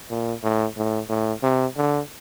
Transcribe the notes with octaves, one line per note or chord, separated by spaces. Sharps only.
A#2
A2
A2
A2
C3
D3